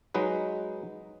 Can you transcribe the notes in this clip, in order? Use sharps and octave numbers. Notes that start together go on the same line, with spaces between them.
F#3 G#3 D#4 B4